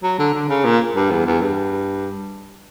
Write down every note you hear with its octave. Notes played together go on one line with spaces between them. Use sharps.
F#3
D3
D3
C#3
A#2
G2
E2
E2
G2